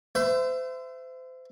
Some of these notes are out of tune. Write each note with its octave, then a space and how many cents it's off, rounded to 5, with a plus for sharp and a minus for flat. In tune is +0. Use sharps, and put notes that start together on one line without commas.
C5 -35 E5 +15